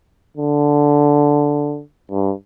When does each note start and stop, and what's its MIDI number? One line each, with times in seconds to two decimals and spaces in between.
0.37 1.81 50
2.11 2.32 43